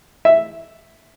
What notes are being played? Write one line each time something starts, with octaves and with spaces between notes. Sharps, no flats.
E5